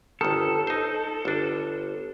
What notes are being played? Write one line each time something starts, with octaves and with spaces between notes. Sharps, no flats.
G1 D#3 A4
D#4 C5
G1 D4